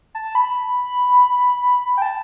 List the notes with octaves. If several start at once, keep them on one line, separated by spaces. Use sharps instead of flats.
A5
B5
G5
A5